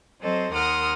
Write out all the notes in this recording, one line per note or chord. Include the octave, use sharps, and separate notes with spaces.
F#3 C4 A4 C5 D#5
D#2 A#4 F#5 C6 D#6 F6